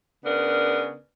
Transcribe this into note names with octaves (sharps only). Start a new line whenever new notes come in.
C#3 B3 D4 A#4